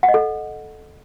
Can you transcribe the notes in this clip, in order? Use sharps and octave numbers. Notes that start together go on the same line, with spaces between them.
F#5
D#5
A4